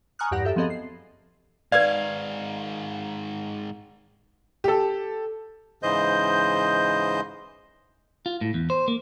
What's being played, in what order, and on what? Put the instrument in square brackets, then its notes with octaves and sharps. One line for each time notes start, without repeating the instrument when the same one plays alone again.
[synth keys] G#5 A#5 C#6 D#6 F6 F#6
E2 G2 G4 F#5 A#6
F#2 G4 A4 E5 E6
F3 B3 C4 G#4 A4 D#5
C7
[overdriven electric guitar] G#2 D#3 [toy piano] B4 D5 [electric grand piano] F5 G#6
[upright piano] G4 A4
[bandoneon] G#2 C#3 E3 C5 D#5 G6
[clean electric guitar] F4
A2
E2
C5
A#3